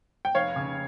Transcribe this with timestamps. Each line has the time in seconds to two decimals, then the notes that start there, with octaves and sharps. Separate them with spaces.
0.25 G5
0.35 F1 C#5 F5
0.56 C#3